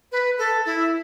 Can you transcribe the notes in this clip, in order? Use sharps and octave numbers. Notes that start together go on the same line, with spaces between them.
B4
A4
E4